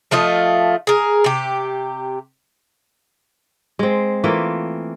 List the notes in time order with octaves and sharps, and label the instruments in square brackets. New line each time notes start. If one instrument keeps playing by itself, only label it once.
[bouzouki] F3 A3 F4 D#5
G#4 A#4
C3 G4
[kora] G#3 C4
E3 A3 A#3 F4